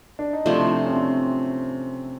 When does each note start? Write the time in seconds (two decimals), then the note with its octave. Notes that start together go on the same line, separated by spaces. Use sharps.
0.19 D4
0.33 D#4
0.45 C3 F3 A3 D4 E4
0.84 C#4
0.91 C4 D4